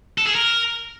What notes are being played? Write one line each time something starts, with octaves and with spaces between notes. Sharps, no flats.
A4
G#4
A#4